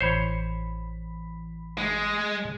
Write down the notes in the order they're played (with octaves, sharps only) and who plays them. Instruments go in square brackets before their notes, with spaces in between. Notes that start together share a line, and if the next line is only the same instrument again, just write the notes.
[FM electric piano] A1 E3 B5 [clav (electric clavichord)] C5 C#5
[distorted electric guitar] G#3